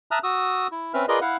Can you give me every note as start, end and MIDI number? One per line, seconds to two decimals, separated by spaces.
0.11 0.19 76
0.11 0.19 81
0.11 0.19 82
0.11 0.19 87
0.11 0.19 89
0.11 0.19 90
0.23 0.67 66
0.23 0.67 87
0.23 0.67 88
0.72 0.93 64
0.94 1.06 60
0.94 1.06 61
0.94 1.06 71
0.94 1.06 76
0.94 1.06 89
1.08 1.19 65
1.08 1.19 68
1.08 1.19 70
1.08 1.19 71
1.08 1.19 74
1.08 1.19 75
1.21 1.37 64
1.21 1.37 77
1.21 1.37 78